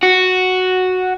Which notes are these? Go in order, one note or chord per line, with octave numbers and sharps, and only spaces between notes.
F#4